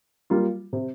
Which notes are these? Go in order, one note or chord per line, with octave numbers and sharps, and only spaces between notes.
G3 A#3 F4
C3